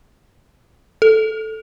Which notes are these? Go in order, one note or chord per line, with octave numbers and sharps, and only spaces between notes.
A4